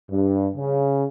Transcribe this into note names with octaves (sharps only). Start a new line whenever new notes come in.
G2
C#3